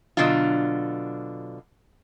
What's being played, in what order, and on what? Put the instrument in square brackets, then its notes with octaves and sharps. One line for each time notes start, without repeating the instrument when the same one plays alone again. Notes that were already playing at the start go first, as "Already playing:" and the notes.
[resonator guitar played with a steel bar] B2 D3 F#3 D4 F4